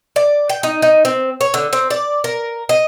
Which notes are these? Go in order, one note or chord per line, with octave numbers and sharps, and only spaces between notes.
D5
G5
D#4
D#4
C4
C#5
D3
C4
D5
A#4
D#5